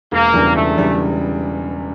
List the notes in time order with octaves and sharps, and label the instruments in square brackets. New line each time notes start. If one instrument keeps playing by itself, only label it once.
[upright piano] E1 [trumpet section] A#3
[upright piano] E2 C#3 G3 D4
[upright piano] E1 [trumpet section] A3
[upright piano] E2 C#3 G3 D4